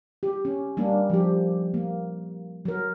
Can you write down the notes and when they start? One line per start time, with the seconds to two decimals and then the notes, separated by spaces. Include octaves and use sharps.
0.23 G4
0.45 C#4
0.77 G3 A#3 D4
1.10 F3 G4
1.74 A#3
2.65 F#3 A#4